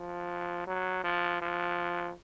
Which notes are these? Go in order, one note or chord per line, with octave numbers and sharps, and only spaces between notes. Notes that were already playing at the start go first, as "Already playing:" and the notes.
Already playing: F3
F#3
F3
F3